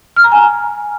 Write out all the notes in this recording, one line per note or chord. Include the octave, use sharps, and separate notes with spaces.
F6
A#5
G#5